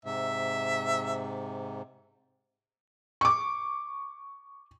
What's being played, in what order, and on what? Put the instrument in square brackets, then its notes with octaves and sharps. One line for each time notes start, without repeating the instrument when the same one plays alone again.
[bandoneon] G#2 C3 [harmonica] E5
[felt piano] C#6 D6